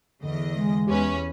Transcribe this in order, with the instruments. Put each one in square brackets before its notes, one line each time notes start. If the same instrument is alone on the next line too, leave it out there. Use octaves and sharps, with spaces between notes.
[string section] E2 D#5 [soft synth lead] D3
[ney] G#3
[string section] E2 C#4 B4 [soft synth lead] G4